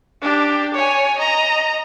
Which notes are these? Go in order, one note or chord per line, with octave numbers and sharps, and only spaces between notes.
D4 G4
C#5 G#5
D#5 A#5